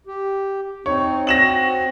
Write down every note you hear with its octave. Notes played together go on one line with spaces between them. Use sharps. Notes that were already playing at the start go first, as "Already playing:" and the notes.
G4
C4 D#4 C#5
C4 F#4 A#6 E7 F#7